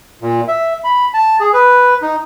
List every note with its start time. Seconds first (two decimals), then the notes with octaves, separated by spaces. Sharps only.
0.22 A#2
0.48 E5
0.84 B5
1.14 A5
1.40 G#4
1.53 B4
2.02 D#4